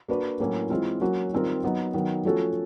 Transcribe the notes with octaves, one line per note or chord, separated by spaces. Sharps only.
A#3 D4 F#4 B4
A2 F#3 A#3 C#4 E4
E3 G#3 C4 F4
F#3 A#3 C#4 F#4
D#3 G3 C4 F4 A#4
F#3 B3 D#4
D#3 F#3 B3
F3 A3 C#4 F#4 A4